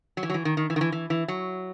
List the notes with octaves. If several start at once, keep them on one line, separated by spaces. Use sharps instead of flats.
F#3
E3
F#3
E3
D#3
D#3
E3
D#3
E3
E3
E3
F#3